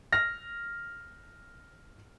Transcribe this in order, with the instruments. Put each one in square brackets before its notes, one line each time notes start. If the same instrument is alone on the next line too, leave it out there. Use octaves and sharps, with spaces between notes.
[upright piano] F6 A#6